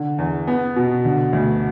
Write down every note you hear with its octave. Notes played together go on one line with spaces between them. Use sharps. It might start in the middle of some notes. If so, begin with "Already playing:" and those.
Already playing: D3
E2
B3
B2
D3
D2